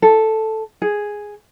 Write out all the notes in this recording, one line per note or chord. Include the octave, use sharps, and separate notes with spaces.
A4
G#4